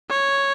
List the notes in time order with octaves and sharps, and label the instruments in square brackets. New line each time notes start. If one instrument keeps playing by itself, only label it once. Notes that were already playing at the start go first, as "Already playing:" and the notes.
[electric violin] C#5